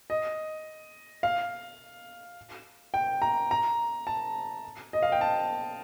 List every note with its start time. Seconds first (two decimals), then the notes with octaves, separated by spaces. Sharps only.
0.10 D#5
1.23 F5
2.94 G5
3.22 A#5
3.51 A#5
4.07 A5
4.93 D#5
5.03 F5
5.12 G5
5.21 A5